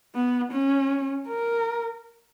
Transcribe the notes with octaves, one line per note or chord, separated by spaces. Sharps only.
B3
C#4
A#4